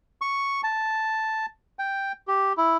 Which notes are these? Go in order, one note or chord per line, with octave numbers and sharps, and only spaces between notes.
C#6
A5
G5
G4
E4